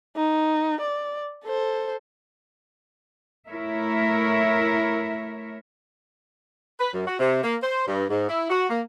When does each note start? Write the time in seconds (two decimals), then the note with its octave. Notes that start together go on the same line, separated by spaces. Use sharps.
0.16 D#4
0.81 D5
1.44 A4 C5
3.50 A3 E4 A#4 C#5 E5
6.80 B4
6.94 F#2
7.07 F#4
7.20 C3
7.44 A#3
7.63 C5
7.87 G2
8.10 G#2
8.29 E4
8.50 F#4
8.70 A#3